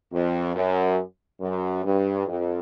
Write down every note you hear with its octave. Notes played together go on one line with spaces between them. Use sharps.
F2
F#2
F#2
G2
F2